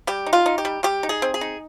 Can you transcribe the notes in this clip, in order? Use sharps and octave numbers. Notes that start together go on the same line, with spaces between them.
G3 G4
D#4
F4
D#4
G4
G3
G3 G4
D#4
G#4
C4
G#4
D#4